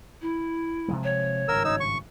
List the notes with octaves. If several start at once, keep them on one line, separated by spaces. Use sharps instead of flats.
E4
C3 F3 G#3
C#5
G#1 G2 C#3 A#4 E6
D#4 E6
C#6